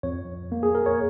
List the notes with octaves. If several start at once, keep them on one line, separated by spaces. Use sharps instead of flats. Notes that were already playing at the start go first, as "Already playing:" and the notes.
F2 C#5
A#3
G#4
A#4
C#5